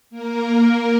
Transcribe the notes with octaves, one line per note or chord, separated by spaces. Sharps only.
A#3 A#4